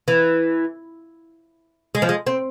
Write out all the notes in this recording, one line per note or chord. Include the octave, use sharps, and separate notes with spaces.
E3
G#3
F3
G#3
C4